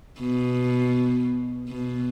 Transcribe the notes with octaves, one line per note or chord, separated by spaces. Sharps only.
B2
B2